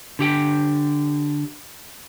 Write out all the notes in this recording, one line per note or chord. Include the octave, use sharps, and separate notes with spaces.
D3 G4 G5